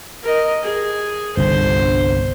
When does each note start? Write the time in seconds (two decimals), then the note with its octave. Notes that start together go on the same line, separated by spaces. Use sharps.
0.23 A#4 D#5
0.63 G#4
1.37 G1 C2 D3 C5